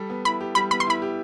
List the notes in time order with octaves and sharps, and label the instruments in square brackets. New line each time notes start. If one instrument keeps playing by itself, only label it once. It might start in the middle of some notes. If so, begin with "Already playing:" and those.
Already playing: [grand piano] G3 A4
B3
[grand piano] E4 [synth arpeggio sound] B5
[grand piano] G4
[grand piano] G3 [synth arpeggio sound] B5
[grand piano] B3 [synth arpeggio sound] B5
[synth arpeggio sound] C6
[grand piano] E4 [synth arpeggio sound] B5
[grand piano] G4